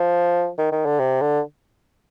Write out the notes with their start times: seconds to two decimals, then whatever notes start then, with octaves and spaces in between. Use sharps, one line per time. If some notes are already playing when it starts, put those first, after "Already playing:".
Already playing: F3
0.58 D#3
0.72 D#3
0.86 D3
0.99 C3
1.21 D3